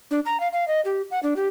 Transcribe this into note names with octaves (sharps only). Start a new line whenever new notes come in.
D4
A#5
F5
F5
D#5
G4
F#5
D4
G4